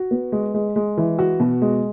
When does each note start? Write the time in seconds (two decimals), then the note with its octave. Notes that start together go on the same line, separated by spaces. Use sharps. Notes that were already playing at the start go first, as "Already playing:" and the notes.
Already playing: F#4
0.11 B3
0.32 G#3
0.54 G#3
0.76 G#3
0.97 E3
1.19 F#4
1.40 B2
1.62 G#3